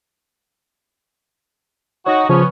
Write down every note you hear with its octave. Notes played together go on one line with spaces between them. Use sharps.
D#4 F#4 C#5
C#3 F3 B3 C#4